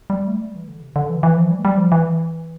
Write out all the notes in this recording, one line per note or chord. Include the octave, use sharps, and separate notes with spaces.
G3
A3
G3
E3
D3
C3
D3
E3
E3
F3
G3
A3
G3
F3
E3